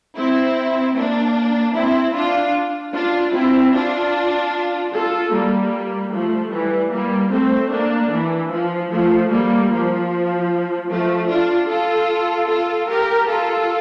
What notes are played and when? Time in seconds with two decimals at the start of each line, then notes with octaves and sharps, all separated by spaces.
0.16 C4 E4
0.95 A#3 D4
1.75 C4 E4
2.14 D4 F4
2.94 D4 F4
3.34 C4 E4
3.74 D4 F4
4.93 F4 A4
5.33 G3 A#3
6.13 F3 A3
6.53 E3 G3
6.92 G3 A#3
7.32 A3 C4
7.72 A#3 D4
8.11 E3
8.51 F3
8.91 F3 A3
9.31 G3 A#3
9.71 F3
10.90 F3 A3
11.29 D4 F4
11.69 F4 A4
12.49 F4 A4
12.89 G4 A#4
13.28 F4 A4